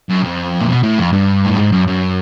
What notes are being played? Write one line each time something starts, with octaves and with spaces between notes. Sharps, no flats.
F#2
F2
A#2
B2
A2
F2
G2
A2
G#2
F#2
F#2